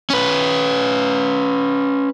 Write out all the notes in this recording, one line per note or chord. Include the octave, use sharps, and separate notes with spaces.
C#4 B4